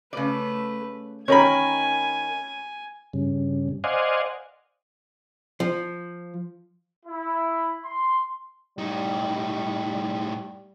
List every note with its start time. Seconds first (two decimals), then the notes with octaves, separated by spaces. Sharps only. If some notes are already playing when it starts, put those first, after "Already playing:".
0.13 C#3 A3 B4 D5
1.28 D#3 C#4 A#4 G#5 B5
3.13 G2 C#3
3.84 C5 D5 D#5 F5 F#5 G#5
5.60 F3
7.06 E4
7.85 C6
8.78 A2 G3 D#4